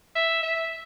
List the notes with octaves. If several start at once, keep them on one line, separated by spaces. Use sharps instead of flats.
E5
E5